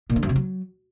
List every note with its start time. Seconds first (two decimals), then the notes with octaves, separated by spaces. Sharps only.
0.10 A#2
0.16 D3
0.23 F#2
0.29 C3
0.36 F#3